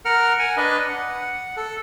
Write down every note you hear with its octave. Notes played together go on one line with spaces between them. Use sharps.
A#4 F#5 F6
F#5 G#5
D4 B4 D#5
F#5
A4